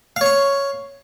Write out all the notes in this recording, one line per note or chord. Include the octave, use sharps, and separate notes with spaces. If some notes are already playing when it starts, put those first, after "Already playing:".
C#5 F5 C#6